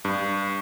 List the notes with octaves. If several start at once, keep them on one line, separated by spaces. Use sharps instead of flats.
G2